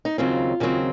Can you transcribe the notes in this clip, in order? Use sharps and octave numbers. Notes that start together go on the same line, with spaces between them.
D#4
D#2 C#3 F#3 C4 F4
D#2 C#3 F#3 C4